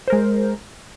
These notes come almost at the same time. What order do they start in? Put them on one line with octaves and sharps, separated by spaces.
C5 A#4 G#3